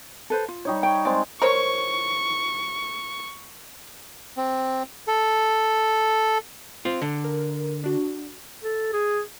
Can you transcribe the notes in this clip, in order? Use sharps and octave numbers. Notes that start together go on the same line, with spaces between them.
A4 B4 C5
F4
G3 D#4 C#5
C#5 G5
G#3 C4 D5
A#4 C5 C#5 C#6
C4
A4
C4 F4
D3
A#4
D4 F#4
A4
G#4